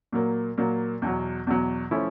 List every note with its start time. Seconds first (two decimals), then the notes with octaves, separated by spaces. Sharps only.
0.12 A#2 F#3 A#3
0.58 A#2 F#3 A#3
1.02 E2 B2 F#3
1.47 E2 B2 F#3
1.91 F3 A3 C#4 E4